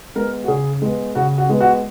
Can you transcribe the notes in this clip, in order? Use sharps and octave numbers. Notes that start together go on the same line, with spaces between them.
G#3 B3 A#4
F#4
C#3 G#4
G#3 B3
C#3 F#4
F#4
G#3 B3
F#4